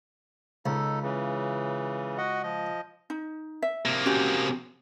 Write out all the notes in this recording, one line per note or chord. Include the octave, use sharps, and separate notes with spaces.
C#2 D#4 A4
C#3 E3
F#4 D#5 F#5
F3 D#5
D#4
E5
C3 A#3
C#4 F#4 G4